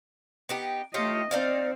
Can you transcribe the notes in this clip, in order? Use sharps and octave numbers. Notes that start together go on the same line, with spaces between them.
B3 D#4 G4
A3 F4 G4 C#5 D#5
C4 D#4 D5 F5